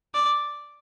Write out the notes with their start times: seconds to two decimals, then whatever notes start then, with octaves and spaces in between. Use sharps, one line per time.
0.14 D5